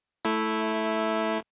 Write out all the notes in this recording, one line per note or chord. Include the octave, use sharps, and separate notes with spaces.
A3 E4